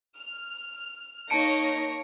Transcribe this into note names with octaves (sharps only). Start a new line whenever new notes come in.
F6
A#3 D#4 C#5 A5 A#6 C#7 D7